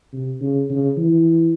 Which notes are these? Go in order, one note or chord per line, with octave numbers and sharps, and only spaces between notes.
C3
C#3
C#3
E3